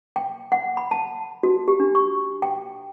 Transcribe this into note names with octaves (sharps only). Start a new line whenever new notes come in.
G5
F#5
B5
A5
F#4
G4
D4
C#6
G5